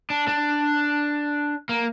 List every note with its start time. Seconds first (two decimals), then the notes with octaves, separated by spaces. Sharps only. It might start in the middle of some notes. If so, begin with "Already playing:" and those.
0.10 D4
0.28 D4
1.69 A#3